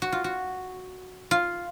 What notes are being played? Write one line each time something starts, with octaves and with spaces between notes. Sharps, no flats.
F#4
F4
F#4
F4